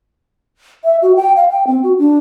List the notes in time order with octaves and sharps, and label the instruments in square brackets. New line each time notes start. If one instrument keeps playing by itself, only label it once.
[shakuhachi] E5
F#4
G5
F5
G5
C4
F#4
D4